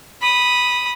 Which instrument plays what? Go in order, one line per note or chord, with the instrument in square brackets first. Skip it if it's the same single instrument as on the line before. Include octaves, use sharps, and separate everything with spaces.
[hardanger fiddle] B5 D#6